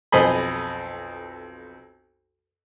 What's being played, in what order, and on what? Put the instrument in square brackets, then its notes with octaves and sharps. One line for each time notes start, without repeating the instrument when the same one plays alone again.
[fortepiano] B1 F2 C5 D#5 G#5 B5